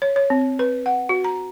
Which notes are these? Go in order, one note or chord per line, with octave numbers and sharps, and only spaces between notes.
C#5
C#5
C4
B4
F#5
F#4
A#5